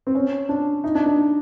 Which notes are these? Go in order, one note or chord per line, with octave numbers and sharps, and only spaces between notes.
C4
C#4
D4
D#4
D4
D4